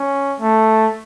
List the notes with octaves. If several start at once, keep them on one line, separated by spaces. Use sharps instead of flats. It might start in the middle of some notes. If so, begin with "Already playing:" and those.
Already playing: C#4
A3